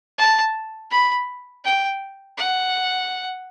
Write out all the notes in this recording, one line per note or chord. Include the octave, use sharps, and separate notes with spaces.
A5
B5
G5
F#5